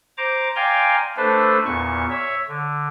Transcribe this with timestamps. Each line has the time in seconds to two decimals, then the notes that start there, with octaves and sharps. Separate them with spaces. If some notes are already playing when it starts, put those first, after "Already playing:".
0.17 C5 A#5 D6
0.55 D5 F5 G5 G#5 A#5 C6
1.17 A3 D4 A4 B4 C5
1.65 E2 A#2 C#6
2.10 C#5 E5
2.48 D3